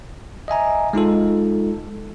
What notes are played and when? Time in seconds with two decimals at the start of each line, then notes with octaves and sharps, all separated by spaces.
0.48 D#5 E5 G#5 A#5
0.93 G#3 D#4 F4 A4